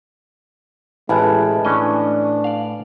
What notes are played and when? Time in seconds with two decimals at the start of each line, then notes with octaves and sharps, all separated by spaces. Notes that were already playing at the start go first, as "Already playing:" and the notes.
1.09 A1 G#3 E4 B4 G#5 A5
1.65 A2 E3 C#4 D4 D#5
2.44 D5 F5